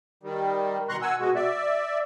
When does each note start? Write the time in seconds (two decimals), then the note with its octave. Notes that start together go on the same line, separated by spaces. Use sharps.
0.23 D#3 G3
0.89 B2 D#3 A#5 C6 C#6 F#6
1.02 F#5 G#5 E6
1.19 B2 G#3 F#4
1.35 D5 E5